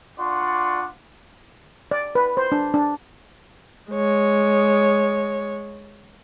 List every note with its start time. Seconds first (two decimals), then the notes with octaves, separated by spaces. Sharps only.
0.19 D4 F4 D5 F#5 C6 C#6
1.91 D5
2.15 B4
2.37 C5
2.52 D4
2.74 D4
3.91 G#3 C#5